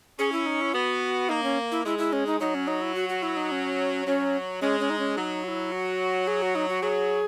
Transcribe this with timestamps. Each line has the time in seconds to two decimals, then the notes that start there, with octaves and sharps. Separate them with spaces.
0.19 C#4 G#4
0.32 E4
0.46 D#4
0.61 E4
0.74 B3 F#4
1.29 A#3 D#4
1.43 C#4
1.72 E4
1.85 G#3 E4
1.99 E4
2.13 C#4
2.27 D#4
2.40 F#3 D#4
2.55 C#4
2.67 D#4
2.81 E4
2.95 F#4
3.09 F#4
3.23 E4
3.37 D#4
3.51 C#4
4.06 F#3 C#4
4.61 G#3 C#4
4.80 C#4
4.90 D#4
4.99 C#4
5.17 F#3 D#4
5.44 F#4
5.48 E4
5.72 F#4
6.27 G#4
6.42 F#4
6.55 D#4
6.68 F#4
6.82 F#3 G#4